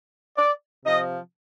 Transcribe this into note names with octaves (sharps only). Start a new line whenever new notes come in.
D5
C3 F3 D#5